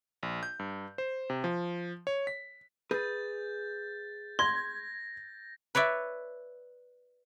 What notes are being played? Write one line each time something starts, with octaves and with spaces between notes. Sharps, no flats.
A#1
G6
G2
C5
C3
F3
C#5
B6
G#4 B4 G6 A6
C6 G#6 A#6
B4 C#5 D5 E5